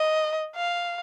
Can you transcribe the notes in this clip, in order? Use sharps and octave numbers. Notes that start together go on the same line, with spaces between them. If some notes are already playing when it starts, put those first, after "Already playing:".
Already playing: D#5
F5